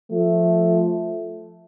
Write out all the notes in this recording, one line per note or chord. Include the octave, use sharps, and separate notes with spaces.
F3 A3